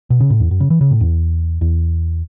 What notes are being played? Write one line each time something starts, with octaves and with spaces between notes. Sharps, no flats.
B2
C#3
A2
E2
F#2
C#3
E3
C#3
A2
E2
E2